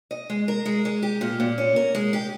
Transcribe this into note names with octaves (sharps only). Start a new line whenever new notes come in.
D#5
G#3
A#4
G#3
G#3
G4
A#2
A#2
C#4
A#4
G#3
G4